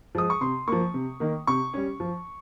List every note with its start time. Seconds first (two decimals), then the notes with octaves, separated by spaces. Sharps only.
0.15 F3 G#3 D#6
0.30 C#6
0.41 C3 C6
0.68 F3 A#3 C#6
0.94 C3
1.20 D#3 A#3
1.47 C3 C#6
1.74 G3 C#4
2.00 F3